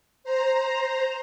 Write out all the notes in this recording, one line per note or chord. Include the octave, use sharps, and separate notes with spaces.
C5 A#5